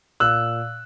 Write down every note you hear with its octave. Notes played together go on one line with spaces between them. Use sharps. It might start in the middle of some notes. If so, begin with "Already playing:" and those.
A#2 E6 F#6